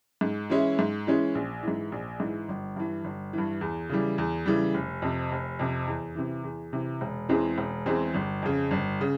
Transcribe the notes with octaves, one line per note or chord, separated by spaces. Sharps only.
G#2
E3 G#3 C#4 E4
G#2
E3 G#3 C#4 E4
A#1
G#2 E3
A#1
G#2 E3
G1
G2 E3
G1
G2 E3
E2
C#3 E3 G3
E2
C#3 E3 G3
F1
F2 C3
F1
F2 C3
E2
C3 E3
E2
C3 E3
E1
E2 E3 G#3 C4
E1
E2 E3 G#3 C4
G1
F2 C#3
G1
C#3